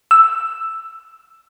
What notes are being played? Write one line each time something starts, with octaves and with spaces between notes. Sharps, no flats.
E6